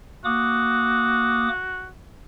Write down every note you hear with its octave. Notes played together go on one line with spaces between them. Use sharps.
A#3 F#4 D6 D#6